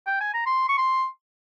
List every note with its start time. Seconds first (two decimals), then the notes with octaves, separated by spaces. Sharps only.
0.07 G5
0.21 G#5
0.34 A#5
0.46 C6
0.69 C#6
0.78 C6